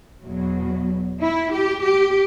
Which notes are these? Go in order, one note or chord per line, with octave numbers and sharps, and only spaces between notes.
E2 B2 F#3
E4
G4
G4